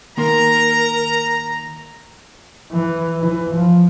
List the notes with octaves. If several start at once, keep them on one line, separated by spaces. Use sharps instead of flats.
D#3 A#3 A#4 A#5 C6
E3
E3
F3